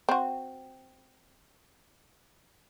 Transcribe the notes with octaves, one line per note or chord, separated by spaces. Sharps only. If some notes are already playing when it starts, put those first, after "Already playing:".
C4 F#4